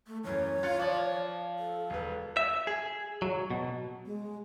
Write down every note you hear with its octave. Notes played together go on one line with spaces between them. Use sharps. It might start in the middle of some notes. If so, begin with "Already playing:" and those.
A3
F#2 E3 C#5
F4 F#6 A6 C#7
F3 D5 F#7
A4
E1 B4
E5
G#4
F#3
B2
G#3